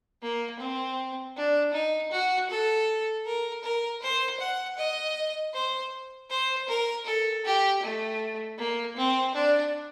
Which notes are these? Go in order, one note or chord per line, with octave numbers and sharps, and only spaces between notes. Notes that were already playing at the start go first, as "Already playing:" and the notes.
A#3
C4
D4
D#4
F#4
A4
A#4
A#4
C5
F#5
D#5
C5
C5
A#4
A4
G4
A3
A#3
C4
D4